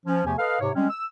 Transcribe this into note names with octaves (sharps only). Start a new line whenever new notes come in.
F3 C#4
E2 C3 F3 A3 G4 G#5
A4 B4 D#5 F5
G#2 C3 C#5
G3 G#3 C4 C#4
E6